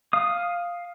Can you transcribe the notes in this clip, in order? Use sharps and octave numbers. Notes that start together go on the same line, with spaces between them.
F5 D#6